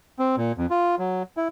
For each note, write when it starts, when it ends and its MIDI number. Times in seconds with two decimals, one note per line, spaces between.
0.19 0.36 60
0.37 0.52 46
0.58 0.66 41
0.70 0.95 65
0.99 1.23 54
1.37 1.48 64